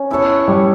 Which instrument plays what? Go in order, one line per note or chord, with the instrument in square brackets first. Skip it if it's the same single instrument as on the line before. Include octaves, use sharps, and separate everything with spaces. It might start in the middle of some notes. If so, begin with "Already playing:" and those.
Already playing: [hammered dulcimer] C#4
B3 E4 A4 C#5
[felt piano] G3